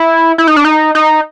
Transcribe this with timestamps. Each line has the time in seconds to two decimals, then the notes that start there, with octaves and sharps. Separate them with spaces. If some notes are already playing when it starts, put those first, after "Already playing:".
Already playing: E4
0.38 E4
0.47 D#4
0.56 D4
0.65 D#4
0.95 D#4